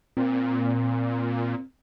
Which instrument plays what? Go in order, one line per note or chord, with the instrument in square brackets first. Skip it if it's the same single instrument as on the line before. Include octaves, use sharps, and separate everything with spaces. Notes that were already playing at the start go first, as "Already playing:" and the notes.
[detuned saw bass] A#2 [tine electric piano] C4